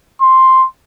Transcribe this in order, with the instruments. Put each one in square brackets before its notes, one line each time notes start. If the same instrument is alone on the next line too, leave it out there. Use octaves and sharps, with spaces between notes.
[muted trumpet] C6